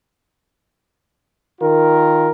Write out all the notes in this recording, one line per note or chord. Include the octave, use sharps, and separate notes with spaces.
D#3 F4 A#4